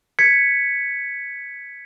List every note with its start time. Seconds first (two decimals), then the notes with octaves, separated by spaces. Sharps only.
0.19 G#6 B6 C#7